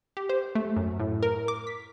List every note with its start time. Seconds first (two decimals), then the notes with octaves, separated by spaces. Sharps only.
0.17 G4
0.29 C5
0.55 A3
0.77 F#2
0.99 A2
1.23 A#4
1.48 D6
1.67 B6